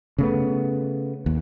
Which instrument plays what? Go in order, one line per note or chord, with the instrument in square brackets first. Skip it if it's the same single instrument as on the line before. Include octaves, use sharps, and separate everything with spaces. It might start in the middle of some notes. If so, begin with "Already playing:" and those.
[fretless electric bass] C#3 A3 B3
D#2